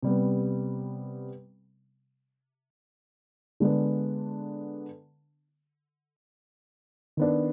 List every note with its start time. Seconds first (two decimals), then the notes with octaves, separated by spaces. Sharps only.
0.02 C3 G3 B3
3.60 D3 G#3 B3 D4
7.17 D#3 B3 D4